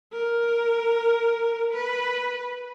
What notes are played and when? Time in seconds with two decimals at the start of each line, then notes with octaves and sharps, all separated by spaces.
0.12 A#4
1.73 B4